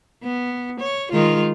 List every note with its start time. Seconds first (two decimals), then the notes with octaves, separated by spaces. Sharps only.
0.23 B3
0.80 C#5
1.12 D#3 G#3 F4